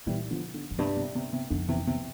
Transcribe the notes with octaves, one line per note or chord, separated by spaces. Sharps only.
A#2 E3 G3
D3 F3
D3
F2
G2 C3
C3
C3
C3
F2 D3
C3 E3
C3